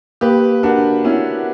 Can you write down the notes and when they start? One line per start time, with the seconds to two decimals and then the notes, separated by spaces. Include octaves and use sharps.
0.21 A#3 G4 B4
0.63 D4 F#4 A#4
1.05 B3 C#4 E4